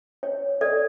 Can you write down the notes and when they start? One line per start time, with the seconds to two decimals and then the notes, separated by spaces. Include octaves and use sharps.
0.23 C#5
0.61 A4 D5